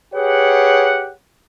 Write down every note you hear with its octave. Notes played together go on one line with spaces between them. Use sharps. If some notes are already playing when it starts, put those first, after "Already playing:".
G4 G#4 B4 C#5 F#5